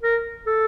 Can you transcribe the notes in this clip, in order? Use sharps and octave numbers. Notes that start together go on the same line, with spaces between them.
A#4
A4